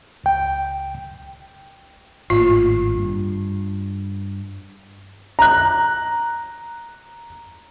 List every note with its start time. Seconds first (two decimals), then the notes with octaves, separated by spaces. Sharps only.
0.24 C#2 G5
2.30 G#1 A2 A#3 F4
2.97 G2
5.39 A#5 F#6